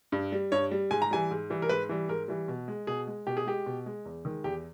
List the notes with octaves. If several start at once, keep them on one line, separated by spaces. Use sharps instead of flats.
G2
G3
G2 C#5
G3
G#2 G#5
A#5
E3 G3 G#5
G#2
E3 G3
A#4
G#2 B4
E3 G3
G#2 A#4
E3 G3
B2
G#3
B2 G#4
G#3
B2 G4
G#4
G#3 G4
B2
G#3
E2
D#3 G#3
E2 G4